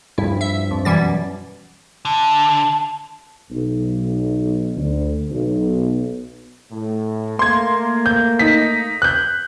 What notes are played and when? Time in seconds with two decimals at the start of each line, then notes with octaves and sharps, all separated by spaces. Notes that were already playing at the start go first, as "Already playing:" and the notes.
0.18 G2 F3 E4
0.41 E5
0.71 F2
0.85 F#2 B2 E3 G3 A6
2.05 D3 A5
3.50 B1
4.75 D2
5.30 B1
6.71 A2
7.39 A3 A#3 C6 G#6
8.06 G6
8.39 D#4 B6
9.02 F#6 G6